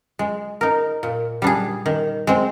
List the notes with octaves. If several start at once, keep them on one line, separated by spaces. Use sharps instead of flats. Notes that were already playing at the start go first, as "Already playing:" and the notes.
G#3
D#4 A#4
A#2
G3 D4 G#4
D#3
G#3 C4